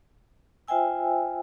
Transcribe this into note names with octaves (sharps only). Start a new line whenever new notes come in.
F4 C5 E5 G5 G#5 E6